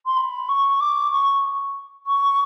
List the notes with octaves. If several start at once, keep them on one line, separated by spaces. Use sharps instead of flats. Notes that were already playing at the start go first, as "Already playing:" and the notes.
C6
B5
C#6
D6
C#6
C#6